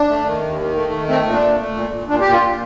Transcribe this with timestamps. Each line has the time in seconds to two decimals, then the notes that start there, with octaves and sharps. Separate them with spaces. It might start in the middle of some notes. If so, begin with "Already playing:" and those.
Already playing: D4
0.09 A3
0.26 D#3
0.43 D#2
0.59 D#3
0.76 A3
0.92 D#3
1.08 A3 C4
1.26 A#2
1.33 D4
1.42 A3
1.58 A3
1.75 A#2
1.91 A#2
2.08 A#2 D4
2.21 A#2 G4
2.32 F4
2.41 A#2